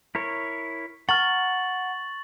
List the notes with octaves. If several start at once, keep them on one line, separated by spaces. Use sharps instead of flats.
E4 A#4 C#5
F#5 A#5 C#6 F6 A6 F#7